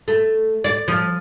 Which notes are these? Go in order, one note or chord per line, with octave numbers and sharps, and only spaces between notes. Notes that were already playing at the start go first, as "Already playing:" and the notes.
A3
D5
F3